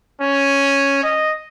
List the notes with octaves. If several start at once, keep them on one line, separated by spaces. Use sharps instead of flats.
C#4
D#5